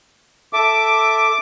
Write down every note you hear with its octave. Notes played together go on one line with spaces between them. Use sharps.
A4 E5 D6